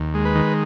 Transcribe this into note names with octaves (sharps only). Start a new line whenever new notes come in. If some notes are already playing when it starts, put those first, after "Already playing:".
Already playing: D#2
G#3
B4
D#3